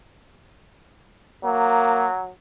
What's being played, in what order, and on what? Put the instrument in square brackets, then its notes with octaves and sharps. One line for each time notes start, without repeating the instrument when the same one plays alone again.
[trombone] F#3 [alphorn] A#3